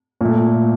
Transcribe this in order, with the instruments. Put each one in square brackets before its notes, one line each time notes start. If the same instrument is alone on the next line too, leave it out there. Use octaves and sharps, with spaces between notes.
[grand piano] A#2 A3